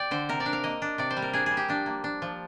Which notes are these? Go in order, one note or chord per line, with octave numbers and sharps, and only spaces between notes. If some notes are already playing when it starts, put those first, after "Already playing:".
Already playing: D5 G5
D3 C5
C3 A#4
D5
D4
F5
A#3 D#5
D4
C3 D5
C5
G3
A#4
D4 G#4
G3 G#4
G4
F3 D4
A#3
D4
F3